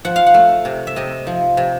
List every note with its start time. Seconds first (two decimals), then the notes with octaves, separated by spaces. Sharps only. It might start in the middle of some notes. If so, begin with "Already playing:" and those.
0.05 F3 F#5
0.16 F5
0.27 F#5
0.34 A3
0.65 C3
0.87 E5
0.96 C3 D#5
1.27 F3
1.57 C3